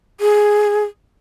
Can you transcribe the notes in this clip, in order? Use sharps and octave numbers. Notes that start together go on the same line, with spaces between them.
G#4